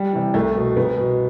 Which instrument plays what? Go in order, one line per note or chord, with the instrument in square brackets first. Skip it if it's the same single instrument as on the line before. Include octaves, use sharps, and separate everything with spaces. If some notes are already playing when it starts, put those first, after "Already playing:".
Already playing: [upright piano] G3
C3 E3
C2 A3
B2
C2 B3
B2